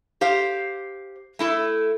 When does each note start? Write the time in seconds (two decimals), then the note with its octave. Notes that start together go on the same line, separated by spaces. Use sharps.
0.21 G4 C5 F5
1.39 A3 E4 A4